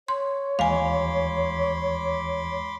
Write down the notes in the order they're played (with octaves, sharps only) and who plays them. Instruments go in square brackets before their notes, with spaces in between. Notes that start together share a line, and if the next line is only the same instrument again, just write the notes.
[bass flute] C#5 [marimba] C6
[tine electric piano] D#2 E3 G#3 [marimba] F5 G#5 [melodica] B5 C6 D6